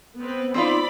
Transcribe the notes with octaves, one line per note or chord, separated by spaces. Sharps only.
B3 C4 B4
C4 D#4 F4 D5 B5